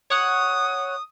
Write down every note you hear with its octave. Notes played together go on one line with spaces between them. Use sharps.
C#5 F#5 D#6